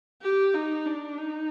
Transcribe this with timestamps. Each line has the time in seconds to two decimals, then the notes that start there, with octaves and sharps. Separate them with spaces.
0.22 G4
0.54 D#4
0.86 D4
1.17 D#4